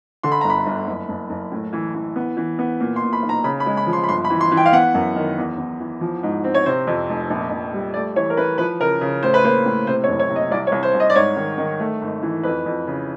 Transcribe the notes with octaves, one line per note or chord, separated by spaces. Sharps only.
D3 C6
B5
G1 A#5
B5
G1
F#1
F#1
F#1
A2
E3
E3
B3
E3
B3
A#2
C6
A#2
B5
B1
A#5
C#3 B5
B5
G#3
B5
F3
C6
B5
G1 C6
B5
E3
C6
E3
G5
F5
B3 F#5
F#2
D#3
E2
E2
E3
F3
G#2
C4
C#5
C3 C5
F2
F1
A#1
A#1
G3
A3 D5
E3 C#5
A#4
E3 B4
F3 B4
C#3 A#4
C#3
A2 C5
B4
A#3 C5
A2
C3 C5
C#5
F#1
C#5
C3
D#5
C2 D5
C#5
C2
C5
C2
D#5
D5
G#2 C#5
D#3
D#3
A3
G#1
E3
F2 B4
F2
C#3